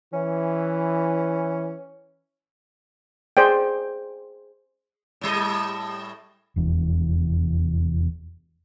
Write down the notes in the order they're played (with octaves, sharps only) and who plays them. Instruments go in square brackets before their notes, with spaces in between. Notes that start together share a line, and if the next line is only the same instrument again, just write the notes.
[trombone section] E3 [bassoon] C#4
[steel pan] G#4 C5 D5 G5
[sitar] A2 G3 D#5
[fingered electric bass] F1 E2